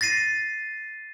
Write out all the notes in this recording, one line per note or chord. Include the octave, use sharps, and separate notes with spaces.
A6 A#6 C7 D#7